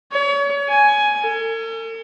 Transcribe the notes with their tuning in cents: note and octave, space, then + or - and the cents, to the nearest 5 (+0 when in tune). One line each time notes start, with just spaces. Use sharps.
C#5 +35
G#5 +10
A4 +45